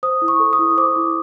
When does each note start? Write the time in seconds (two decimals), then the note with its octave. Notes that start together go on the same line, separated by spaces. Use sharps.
0.03 C5 D#6
0.22 E4
0.28 C#6
0.40 A4
0.53 D#6
0.59 E4
0.78 C5 D6
0.96 E4